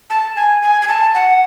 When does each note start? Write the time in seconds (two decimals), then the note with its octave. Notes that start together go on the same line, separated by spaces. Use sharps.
0.10 A5
0.36 G#5
0.62 G#5
0.82 G#5
0.88 A5
1.14 F#5